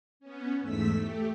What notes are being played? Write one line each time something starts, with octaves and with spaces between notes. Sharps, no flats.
B3 C#4
E2 G#2 A3 E6 B6
A3 G4